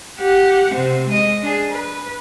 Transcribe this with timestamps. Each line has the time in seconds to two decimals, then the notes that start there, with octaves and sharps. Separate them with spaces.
0.20 G4 F#5
0.74 C3 C4
1.08 G#3 D#5
1.42 D4 G#4
1.72 B4